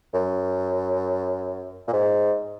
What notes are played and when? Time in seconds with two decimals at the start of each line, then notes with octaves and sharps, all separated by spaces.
0.13 F#2
1.87 A#2
1.93 G#2